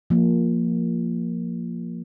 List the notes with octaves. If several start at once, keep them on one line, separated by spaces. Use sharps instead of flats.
F3 A#3